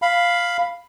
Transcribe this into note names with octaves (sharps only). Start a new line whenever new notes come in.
F5 B5